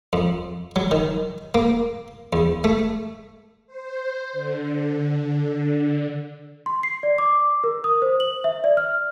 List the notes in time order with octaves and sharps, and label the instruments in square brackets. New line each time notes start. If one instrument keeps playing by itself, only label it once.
[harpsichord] F2
F#3
D#3
A#3
E2
A3
[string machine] C5
D3
[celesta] C6
C7
D5
D6
A#4
D#6
C5
F#7
E5
D5
F6